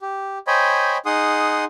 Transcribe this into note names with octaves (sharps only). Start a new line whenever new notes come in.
G4
C5 C#5 D#5 G5 G#5 B5
D#4 G#4 F#5 C6 D#6